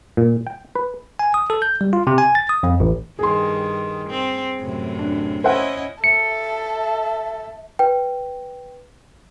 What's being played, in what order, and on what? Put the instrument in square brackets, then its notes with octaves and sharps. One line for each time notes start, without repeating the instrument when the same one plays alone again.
[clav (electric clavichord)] A#2
G5
B4
[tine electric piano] G#5
D#6
A4
G6
G3
F4
C3
G#5
A6
D#6
F2
A1
[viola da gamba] G2 D#3 [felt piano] G#4 C6
[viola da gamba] C4
F#2 A2 C3
[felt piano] D4
[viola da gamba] C#4 E4 D#5 [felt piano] C5 E5 F#5
[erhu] A4 [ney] E5 [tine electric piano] C#7
[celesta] B4 G5